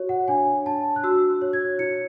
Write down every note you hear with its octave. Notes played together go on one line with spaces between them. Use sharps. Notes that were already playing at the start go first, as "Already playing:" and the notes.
Already playing: F#4 C#5
F#5
D4 G#5
D4 A5
F#6
F#4 E6
C#5
G#6
E4 C#7